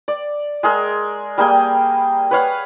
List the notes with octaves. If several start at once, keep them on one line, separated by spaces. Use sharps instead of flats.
D5
G#3 G#4 A#4
G3 A#3 G#4 G5
B4 C#5 F5 F#5